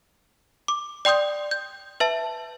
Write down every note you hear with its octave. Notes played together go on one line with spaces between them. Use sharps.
D6
D5 G5 C6 D#6 G6
G6
B4 E5 A5